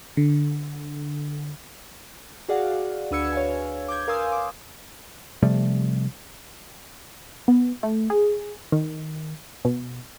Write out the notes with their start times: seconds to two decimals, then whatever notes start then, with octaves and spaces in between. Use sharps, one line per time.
0.17 D3
2.48 F#4 G#4 D5 F5 F#5
3.11 D2 D4 B4 E6 G#6 C#7
3.33 C#5 F5 G#5
3.88 D6 G6 G#6
4.08 A#4 F5 G#5 C6 D#6 E6
4.32 D6
5.43 C3 F3 G3 A3
7.48 B3
7.83 A3
8.10 G#4
8.72 D#3
9.65 B2